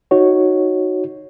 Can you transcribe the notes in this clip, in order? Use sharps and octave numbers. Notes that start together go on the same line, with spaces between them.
D#4 F#4 C#5